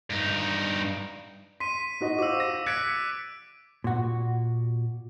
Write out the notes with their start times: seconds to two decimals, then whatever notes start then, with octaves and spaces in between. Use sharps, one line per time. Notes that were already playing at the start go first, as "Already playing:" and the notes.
0.10 G2 D#4
1.60 C6 B6 D#7
2.01 D#4 F#4 D#5
2.19 F#4 C5 F5 D6 E6
2.40 A#6
2.66 F#6 G#6 A6 B6 C#7 D7
3.84 A#2 F#4